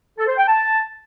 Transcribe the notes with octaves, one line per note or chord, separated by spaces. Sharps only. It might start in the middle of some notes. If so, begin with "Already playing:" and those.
A4
C5
G5
A5